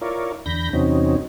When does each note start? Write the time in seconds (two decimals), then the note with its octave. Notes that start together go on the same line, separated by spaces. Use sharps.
0.01 E4 F4 A#4 C#5 D5
0.46 E2 D3 B5 G6 A#6
0.73 E2 C3 F#3 C4 C#4 D#4